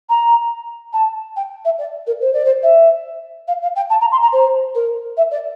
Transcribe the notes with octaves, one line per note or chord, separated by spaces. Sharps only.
A#5
A5
G5
E5
D5
A#4
C5
D5
C5
E5
F5
F5
G5
A5
A#5
C6
A#5
C5
A#4
E5
D5